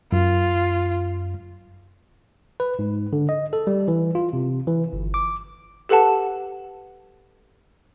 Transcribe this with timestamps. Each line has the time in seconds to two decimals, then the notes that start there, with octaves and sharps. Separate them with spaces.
0.12 F#2 F4
2.60 B4
2.79 G#2
3.13 D3
3.29 D#5
3.53 A4
3.67 G3
3.88 E3
4.15 F4
4.33 C3
4.67 E3
4.93 G1
5.14 D6
5.89 G4 A4 B4 F#5 A5